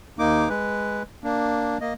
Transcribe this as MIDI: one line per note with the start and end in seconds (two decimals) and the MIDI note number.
0.19 0.49 39
0.19 0.49 58
0.19 0.49 63
0.19 0.49 86
0.49 1.03 56
0.49 1.03 71
1.24 1.78 58
1.24 1.78 62
1.81 1.93 58
1.81 1.93 75